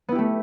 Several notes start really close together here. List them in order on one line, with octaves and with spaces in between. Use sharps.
B3 E4 G4 A3